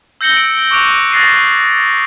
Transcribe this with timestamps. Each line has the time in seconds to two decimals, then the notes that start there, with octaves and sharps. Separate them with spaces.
0.21 E6 G6 A#6 C#7 F#7 G7
0.37 D7
0.71 C#6 D6 F#6 D7 F7
1.12 D#6 F#6 A6 A#6 C7 D#7